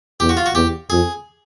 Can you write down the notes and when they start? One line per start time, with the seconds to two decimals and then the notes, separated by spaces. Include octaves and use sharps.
0.20 E2 G4
0.29 F#4
0.37 F4
0.46 F#4
0.55 E2 G4
0.90 F2 G#4